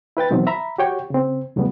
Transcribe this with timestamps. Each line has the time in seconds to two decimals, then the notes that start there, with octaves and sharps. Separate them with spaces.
0.17 E4 B4 G5 A6
0.31 B2 D#3 E3 F#3 C4
0.47 E5 A#5 B5
0.78 F#4 G4 C#5 G5
1.10 C#3 C4
1.56 D#2 A2 C#3 F#3 G3 B3